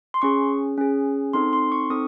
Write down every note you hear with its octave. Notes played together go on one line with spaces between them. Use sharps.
C6
C#4 G#4 C#6
C#4 G#4
C4 D#4 A4 C6
C6
C#6
C4 D#4 A4 D#6